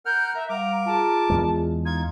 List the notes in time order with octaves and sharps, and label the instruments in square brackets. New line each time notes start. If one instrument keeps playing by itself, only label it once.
[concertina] A#4 F#5 F6 [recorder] G6
[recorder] E5 [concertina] A#5
[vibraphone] G3 F5 F#5 [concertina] A#4 D6 [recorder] A#5
[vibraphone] F4 G#4 [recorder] A5
[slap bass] E2 G#3
[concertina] D#4 F4 [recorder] G#6